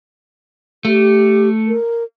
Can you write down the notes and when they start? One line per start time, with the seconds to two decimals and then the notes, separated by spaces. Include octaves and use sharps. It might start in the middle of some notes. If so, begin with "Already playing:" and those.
0.85 A3 G4
1.68 A#4